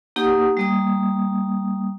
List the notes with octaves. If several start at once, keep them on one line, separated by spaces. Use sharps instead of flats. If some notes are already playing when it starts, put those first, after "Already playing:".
A#3 D#4 G4 F#5 D#6
G3 A#3 D#6